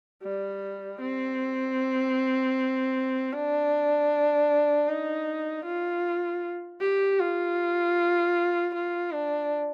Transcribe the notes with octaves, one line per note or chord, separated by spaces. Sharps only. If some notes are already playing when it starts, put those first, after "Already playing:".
G3
C4
D4
D#4
F4
G4
F4
F4
D4